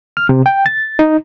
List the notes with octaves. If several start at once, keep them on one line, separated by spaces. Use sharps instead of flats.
F6
C3
G5
A6
D#4